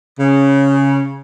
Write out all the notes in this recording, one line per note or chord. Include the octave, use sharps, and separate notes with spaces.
C#3